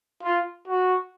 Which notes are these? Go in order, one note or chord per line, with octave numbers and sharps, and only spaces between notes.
F4
F#4